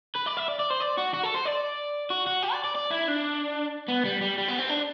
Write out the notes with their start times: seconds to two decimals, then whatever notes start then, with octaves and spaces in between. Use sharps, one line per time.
0.16 B4
0.27 D5
0.37 E5
0.48 D5
0.59 D5
0.70 C5
0.80 D5
0.97 F#4
1.14 F#4
1.23 A4
1.34 C5
1.45 D5
2.10 F#4
2.27 F#4
2.43 G4
2.53 D5
2.64 D5
2.76 D5
2.91 E4
3.08 D4
3.89 B3
4.05 G3
4.21 G3
4.38 G3
4.48 B3
4.59 C4
4.69 D4